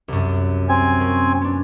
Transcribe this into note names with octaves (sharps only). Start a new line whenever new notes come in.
C2 F#2
C4 G#5
A#3 C#4
B3 D4